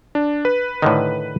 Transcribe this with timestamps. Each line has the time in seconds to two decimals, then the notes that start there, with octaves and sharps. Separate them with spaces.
0.15 D4
0.45 B4
0.82 A2 D3 D#3